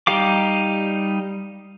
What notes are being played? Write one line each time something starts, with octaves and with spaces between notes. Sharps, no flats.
G3 D#4 G4 F5 D6